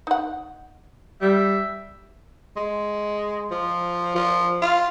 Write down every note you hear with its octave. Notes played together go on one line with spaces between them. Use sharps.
D#4 F#5
G3 E5
G#3
F3
F3
F4